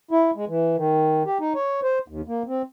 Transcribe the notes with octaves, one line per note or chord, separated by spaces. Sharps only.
E4
G#3
E3
D#3
G4
D#4
C#5
C5
D#2
A#3
C4